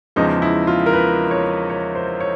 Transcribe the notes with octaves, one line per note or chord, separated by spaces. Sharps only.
E2 C#3 F3 G#3 D#4
E4
F4
A#4
B4
C#5
C#5
C5
C#5